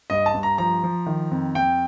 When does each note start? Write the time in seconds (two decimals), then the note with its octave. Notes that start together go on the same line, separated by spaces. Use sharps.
0.10 G2 D#5
0.26 A5
0.34 G2
0.43 A#5
0.58 F3 A#5
0.83 F3
1.06 D#3
1.31 F2
1.55 F2 G5